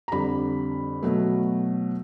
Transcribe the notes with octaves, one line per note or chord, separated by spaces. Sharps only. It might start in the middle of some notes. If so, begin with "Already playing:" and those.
A#5
F2 D3 G3 B5
B2 F#3 A3